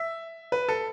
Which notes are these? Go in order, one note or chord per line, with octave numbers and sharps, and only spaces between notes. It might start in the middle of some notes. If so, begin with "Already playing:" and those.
Already playing: E5
B4
A4